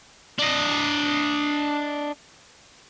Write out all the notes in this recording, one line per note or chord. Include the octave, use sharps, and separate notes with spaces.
D4 D#5